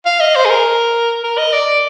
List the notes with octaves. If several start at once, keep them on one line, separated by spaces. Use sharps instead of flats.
F5
D#5
C5
G#4
A#4
A#4
D#5
D5